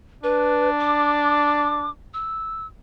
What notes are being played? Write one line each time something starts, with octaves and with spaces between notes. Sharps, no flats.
D4 B4
D6
E6